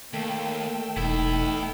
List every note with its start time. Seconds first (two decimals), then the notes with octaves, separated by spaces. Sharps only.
0.13 D#2 A3 A#3 G5 E6
0.97 E1 B3 D#4 E4